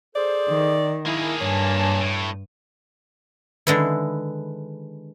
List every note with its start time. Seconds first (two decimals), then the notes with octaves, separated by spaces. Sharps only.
0.16 G#4 A4 C5 D5
0.49 D#3
1.06 A#3 E4 G#4
1.41 G2 C#5 G#5 A5
2.01 A2
3.67 D3 D#3 G#3 E4 B4